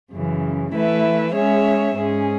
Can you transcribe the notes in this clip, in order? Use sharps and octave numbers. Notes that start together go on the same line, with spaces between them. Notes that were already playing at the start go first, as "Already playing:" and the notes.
F#2 C#3 E3
E3 A3 E4 B4 E5
G#3 C#4 G#4 C#5 E5
G#2 G#3 C#4 G#4